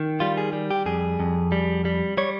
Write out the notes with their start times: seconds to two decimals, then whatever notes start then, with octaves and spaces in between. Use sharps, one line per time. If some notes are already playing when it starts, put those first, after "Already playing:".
Already playing: D#3
0.20 G3 F4
0.37 G#4
0.53 G3
0.71 G4
0.86 F2 G#4
1.20 F2
1.52 G3
1.85 G3
2.17 G3 C#5